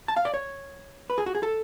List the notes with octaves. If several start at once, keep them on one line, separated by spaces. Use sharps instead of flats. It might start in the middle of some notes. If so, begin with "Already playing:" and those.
A5
F5
D5
C#5
B4
G#4
F#4
G#4
A4